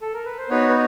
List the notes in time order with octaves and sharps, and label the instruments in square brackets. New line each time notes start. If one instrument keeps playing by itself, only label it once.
[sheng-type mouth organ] A4
A#4
B4
C5
B3 D#4 F#4 B4 C#5
B4